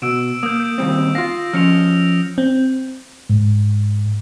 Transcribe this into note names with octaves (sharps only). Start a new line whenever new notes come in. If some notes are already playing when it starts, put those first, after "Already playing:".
B2 E6 D7 E7
A#3 D#6 G6
G6 D7
D#2 G3 C4
F4 F5 A#6
F3 C#4 F6 C#7 F7
C4
G#2